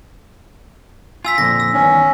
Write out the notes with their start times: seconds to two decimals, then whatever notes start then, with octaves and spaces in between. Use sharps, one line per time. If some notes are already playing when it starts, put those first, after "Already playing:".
1.25 F4 G#5 E6 B6
1.38 F2 A#2 D3 A#6
1.60 E6
1.74 E2 G2 D#3 C#4